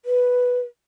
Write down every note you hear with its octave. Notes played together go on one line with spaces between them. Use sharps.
B4